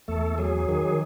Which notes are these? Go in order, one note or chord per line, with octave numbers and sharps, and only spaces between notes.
E2 A3 A4
F#3 G#4
D#3 G#4